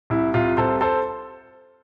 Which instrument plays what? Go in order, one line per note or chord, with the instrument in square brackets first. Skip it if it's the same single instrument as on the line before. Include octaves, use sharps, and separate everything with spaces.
[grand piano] C2 E4
C2 F4
C2 A4 C5
A4 C5